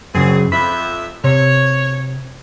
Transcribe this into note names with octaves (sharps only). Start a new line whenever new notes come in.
F#2 A#2 C#3 C4 G#4
F2 E5 B5
C3 C#5